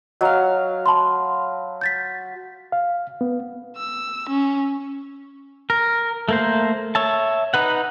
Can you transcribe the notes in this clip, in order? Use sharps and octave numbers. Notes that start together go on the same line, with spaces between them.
F#3 D#5 F5 A#5
A5 B5 C6
G6 A6 B6
F5
B3
E6
C#4
A#4
A3 A#3 C5
C#5 E5 A5
D#4 B4 F#5